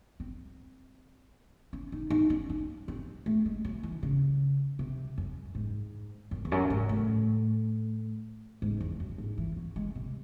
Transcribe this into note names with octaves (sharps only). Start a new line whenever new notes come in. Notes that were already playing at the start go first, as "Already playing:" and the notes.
C4
C#4
D#4
D#4
C#4
C#4
C4
A3
G#3
F#3
E3
C#3
C3
F#2
G#2
F#2
E2
F#2
G#2
A2
G#2
E2
F#2
G#2
E3
F#3
G#3
C3